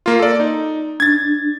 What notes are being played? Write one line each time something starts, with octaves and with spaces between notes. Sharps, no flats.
A#3 F4
A4 D5
D#4
D4 G#6 A6